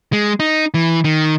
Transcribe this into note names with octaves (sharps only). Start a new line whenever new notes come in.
G#3
D#4
E3
D#3